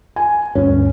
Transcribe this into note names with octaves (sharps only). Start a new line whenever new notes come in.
G#5
D2 G2 C#4